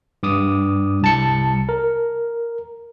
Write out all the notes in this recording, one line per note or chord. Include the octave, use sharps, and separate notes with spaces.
G2 D6 D#6
C2 A5 C#7
A#4